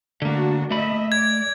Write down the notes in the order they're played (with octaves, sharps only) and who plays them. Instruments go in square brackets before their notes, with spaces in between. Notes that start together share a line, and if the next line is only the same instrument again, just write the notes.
[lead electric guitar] D3 A#3 [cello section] A3 D4 F#4
[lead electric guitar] A3 B5 [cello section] A#3 D#5 E5
[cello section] D5 [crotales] G#6